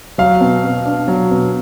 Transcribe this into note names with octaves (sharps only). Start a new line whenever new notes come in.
F#3 F5
B2
B2
D4
F#3
B2